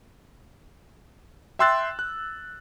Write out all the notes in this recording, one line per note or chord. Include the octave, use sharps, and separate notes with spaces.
E5 G5 C6 E6 F#6 A6
F#6